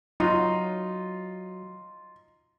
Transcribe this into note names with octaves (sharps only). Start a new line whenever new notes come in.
F#3 D#4 F4